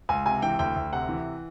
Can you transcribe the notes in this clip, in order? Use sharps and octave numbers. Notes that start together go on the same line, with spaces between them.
C#2 G#5
C3 G#5
E3 G5
D2 G5
D2
C3 F#5
E3